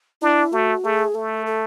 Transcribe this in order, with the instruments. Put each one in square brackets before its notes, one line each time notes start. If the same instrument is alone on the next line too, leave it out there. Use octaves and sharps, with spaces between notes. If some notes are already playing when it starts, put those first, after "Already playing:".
[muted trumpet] D4 [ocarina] E4
[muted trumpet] A3 [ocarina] F#4
[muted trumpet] A3 [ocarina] G#4
[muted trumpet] A3 [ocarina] A4
[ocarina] A4